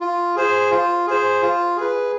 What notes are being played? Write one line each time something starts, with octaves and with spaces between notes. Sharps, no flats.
F4
G#4 C5
F4
G#4 C5
F4
G#4 B4